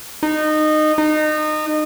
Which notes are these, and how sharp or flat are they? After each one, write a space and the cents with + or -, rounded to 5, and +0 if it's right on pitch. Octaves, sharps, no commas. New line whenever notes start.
D#4 -20
D#4 -25